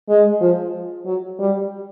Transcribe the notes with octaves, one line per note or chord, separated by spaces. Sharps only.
G#3
F3
F#3
G3